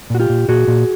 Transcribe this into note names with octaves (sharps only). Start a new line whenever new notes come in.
A#2 F#4
F4 G4
A#2
A#2 F#4 G#4
A#2